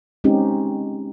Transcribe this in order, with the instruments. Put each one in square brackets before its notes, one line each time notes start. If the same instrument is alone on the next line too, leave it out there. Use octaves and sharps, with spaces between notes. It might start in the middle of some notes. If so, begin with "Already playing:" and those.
[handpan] G#3 C4 C#4 D#4 G4